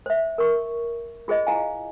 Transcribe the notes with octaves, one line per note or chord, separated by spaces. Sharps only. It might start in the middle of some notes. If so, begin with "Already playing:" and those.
C5 E5
A#4 C#6
F4 G#4 C5 D#5
E4 F5 G#5